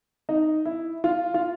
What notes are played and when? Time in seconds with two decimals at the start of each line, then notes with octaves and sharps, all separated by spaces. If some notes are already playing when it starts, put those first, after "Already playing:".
0.29 D#4
0.65 E4
1.04 F4
1.34 F4